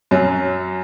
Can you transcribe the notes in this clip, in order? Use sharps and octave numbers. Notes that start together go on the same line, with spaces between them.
F#2 F#3